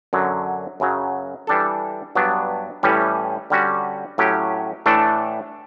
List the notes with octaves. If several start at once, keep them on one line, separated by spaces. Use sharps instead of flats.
F#2 D3 F#3
F#2 C#3 F#3
E3 G3 D4 A4
G2 F#3 B3 D4
A2 E3 G3 C#4
D3 G3 C#4 F#4
A2 F#3 C#4 G4
A2 E3 A3 D4 A4